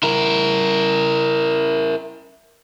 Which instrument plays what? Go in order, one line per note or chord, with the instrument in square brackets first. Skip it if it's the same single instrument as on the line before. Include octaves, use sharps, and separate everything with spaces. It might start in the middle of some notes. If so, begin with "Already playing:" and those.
[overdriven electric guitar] E4 A#4